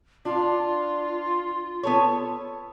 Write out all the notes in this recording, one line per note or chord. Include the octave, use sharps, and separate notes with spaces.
D4 F4
B3 A4 C#5